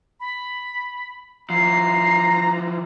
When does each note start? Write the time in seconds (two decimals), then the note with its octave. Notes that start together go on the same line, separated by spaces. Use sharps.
0.20 B5
1.50 E3 F3 A#5 C7